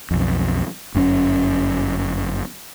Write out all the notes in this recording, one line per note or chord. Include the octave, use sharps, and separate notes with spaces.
B1 F2
G1 F#2 C4 C#4